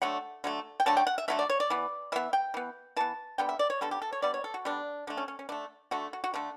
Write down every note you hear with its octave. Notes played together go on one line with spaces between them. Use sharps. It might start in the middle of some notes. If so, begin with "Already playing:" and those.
D3 F#3 A3 F#5
D3 F#3 A3
G5
D3 F#3 A3 A5
G5
F#5
E5
D3 F#3 A3 E5
D5
C#5
D5
E3 B3
E3 B3 E5
G5
E3 B3
E3 B3 A5
D3 G3 B3 G5
E5
D5
C#5
D3 G3 B3 A4
G4
A4
C#5
D3 G3 B3 D5
C#5
A4
F#4
D3 G3 B3 D4
D3 A3 D4
C#4
C#4
C#4
D3 A3 D4
D3 A3 F#4
F#4
F#4
D3 A3 D4